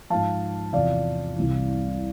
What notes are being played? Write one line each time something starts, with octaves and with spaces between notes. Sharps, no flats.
G#2 F3 F5 A5
E2 C3 F3 D5 F5
C2 C3 E3